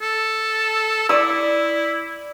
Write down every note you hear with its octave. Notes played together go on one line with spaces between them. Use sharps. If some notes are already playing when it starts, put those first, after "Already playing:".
A4
E4 D5 D#6 E6